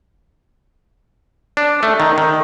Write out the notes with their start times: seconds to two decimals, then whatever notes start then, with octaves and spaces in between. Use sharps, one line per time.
1.57 D4
1.83 A3
2.00 D#3
2.18 D#3